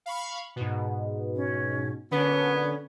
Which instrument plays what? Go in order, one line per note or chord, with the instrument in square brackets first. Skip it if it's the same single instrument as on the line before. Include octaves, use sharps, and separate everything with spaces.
[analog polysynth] F5 B5 C#6
G#2 B2
[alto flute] C#4
[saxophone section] A#2 F#3 B3 [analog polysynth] D3 [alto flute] C#4